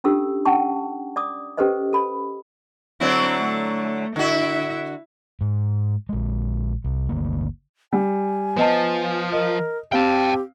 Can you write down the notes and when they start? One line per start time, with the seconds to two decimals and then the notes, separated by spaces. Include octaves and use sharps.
0.04 C#4 D4 F4 G4 A4 E6
0.45 C#4 F#5 G5 A5 C#6
1.16 D5 D6 D#6
1.57 C#4 G4 A4 B4 C5 D#5
1.93 A4 B5
3.00 D3 F#3 C4 E4
3.39 A3
4.16 D3 E4 F#4 E5
5.41 G#2
6.09 A#1 G#3
6.84 C2
7.09 G1 D2 A#3
7.93 G3 G#5
8.57 F3 B3 D#5 A5
9.32 A#4 D#5
9.92 C4 G4 F5 G5 A5